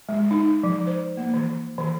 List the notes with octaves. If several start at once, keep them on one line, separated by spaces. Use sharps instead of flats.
G#3
D#4
F3
C5
A#3
E3
E3